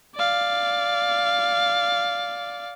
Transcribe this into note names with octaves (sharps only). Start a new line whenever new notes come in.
D5 F5